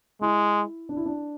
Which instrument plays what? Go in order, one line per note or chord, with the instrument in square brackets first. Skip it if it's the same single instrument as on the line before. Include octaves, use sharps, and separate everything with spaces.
[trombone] G#3 [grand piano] E4
[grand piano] D4
E4
D4